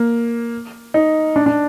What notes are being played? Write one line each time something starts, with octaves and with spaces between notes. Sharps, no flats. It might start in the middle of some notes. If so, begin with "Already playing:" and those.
Already playing: A#3
D#4
D4
D4